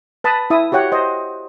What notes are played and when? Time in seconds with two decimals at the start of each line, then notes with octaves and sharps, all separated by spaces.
0.24 B4 A5 B5 D#6
0.50 E4 E5 D#6
0.72 F#4 G4 C#5 F#5 G5
0.92 C5 D#5